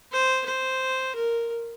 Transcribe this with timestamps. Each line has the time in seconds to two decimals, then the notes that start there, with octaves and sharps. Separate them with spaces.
0.12 C5
0.46 C5
1.16 A#4